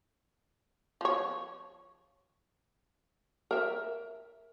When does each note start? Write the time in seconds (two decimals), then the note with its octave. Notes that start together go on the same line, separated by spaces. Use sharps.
1.01 F3 C#5
3.51 A#4 E5